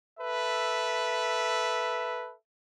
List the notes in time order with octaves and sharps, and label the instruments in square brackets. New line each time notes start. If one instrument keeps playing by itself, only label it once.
[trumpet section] A4 B4 E5